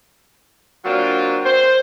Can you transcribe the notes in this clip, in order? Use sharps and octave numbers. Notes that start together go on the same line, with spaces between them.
F#3 A#3 C4 D4 F4
C5